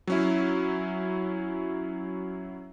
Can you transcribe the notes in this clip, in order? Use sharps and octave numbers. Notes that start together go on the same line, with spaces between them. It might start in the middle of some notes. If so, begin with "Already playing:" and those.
F#3 C#4 E4